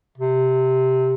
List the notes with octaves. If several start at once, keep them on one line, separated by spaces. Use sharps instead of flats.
C3